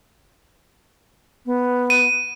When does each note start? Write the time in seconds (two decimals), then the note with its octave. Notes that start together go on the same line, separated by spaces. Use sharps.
1.46 B3
1.90 D#7